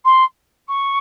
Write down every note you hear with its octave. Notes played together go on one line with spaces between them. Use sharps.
C6
C#6